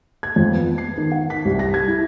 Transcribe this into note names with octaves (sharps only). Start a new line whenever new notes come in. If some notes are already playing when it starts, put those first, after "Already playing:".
G#6
F2
B3
C7
D#3
F#5
B6
C2
A#6
G#6
E4